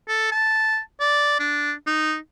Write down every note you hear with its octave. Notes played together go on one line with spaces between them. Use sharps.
A4
A5
D5
D4
D#4